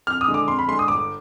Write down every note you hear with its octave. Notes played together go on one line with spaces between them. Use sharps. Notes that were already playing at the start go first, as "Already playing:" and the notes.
F2 F6
D#6
D3 G#3
D6
F2 C6
B5
D3 G#3 C6
D#6
G1 D6